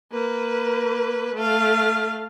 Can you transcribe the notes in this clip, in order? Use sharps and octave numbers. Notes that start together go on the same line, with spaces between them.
A#3 B4
A3 F5